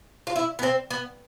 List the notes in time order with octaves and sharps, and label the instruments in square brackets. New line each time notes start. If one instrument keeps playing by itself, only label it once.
[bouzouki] F4
E4
B3
C4
B3